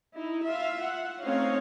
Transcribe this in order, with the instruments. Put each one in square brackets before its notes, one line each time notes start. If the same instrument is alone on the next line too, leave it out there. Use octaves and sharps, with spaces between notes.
[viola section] D#4 E4
F4 E5 F5
F#5
A3 C4 C#4 D#4 C#5 F5